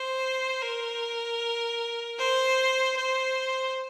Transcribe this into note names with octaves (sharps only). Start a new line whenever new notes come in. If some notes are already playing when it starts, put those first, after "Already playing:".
Already playing: C5
A#4
C5
C5